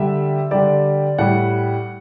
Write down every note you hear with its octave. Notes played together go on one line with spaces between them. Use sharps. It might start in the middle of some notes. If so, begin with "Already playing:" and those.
Already playing: D3 G3 E5
D3 G3 D5
A2 G3 F#5